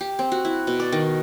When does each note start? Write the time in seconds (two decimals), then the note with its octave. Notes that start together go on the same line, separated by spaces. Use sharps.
0.01 G4
0.19 C4
0.32 F#4
0.45 E4
0.67 B2
0.80 D5
0.92 D#3